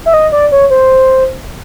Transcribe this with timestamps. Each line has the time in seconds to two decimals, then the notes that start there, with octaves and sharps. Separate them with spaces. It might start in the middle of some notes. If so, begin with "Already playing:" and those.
0.06 E5
0.14 D#5
0.32 D5
0.52 C#5
0.70 C5